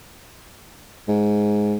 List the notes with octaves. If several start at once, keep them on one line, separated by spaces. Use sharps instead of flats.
G#2